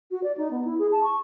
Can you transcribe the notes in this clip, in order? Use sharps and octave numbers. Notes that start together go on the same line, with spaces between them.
F#4
D5
D#4
B3
E4
G#4
A5
C#6